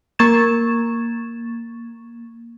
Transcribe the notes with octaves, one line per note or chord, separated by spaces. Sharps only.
A#3 C#6 G#6 A6 E7